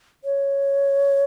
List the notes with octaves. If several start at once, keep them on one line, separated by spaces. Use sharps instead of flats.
C#5